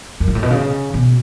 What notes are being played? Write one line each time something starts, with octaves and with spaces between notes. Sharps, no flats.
F#2
G#2
A2
B2
C#3
B2